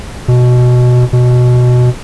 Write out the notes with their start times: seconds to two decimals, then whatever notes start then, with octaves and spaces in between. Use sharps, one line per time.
0.28 B2
1.13 B2